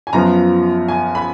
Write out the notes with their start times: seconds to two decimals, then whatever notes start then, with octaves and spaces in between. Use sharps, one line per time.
0.07 G#5
0.13 F#2 F3 B3 F4 A#5
0.88 G#5
1.15 B5